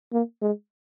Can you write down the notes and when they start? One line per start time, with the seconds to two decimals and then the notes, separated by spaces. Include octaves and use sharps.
0.13 A#3
0.42 G#3